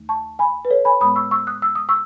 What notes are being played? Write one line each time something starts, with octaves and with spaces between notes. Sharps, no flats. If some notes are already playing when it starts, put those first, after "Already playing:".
Already playing: D#2 D#3 A3 D#4
A5 C#6
G#5 B5
B4
A4 C#5
G#5 B5
A2 G#3 B3 B5 D#6
C#6 E6
C#6 E6
D#6 F#6
E6
D#6
C#6 E6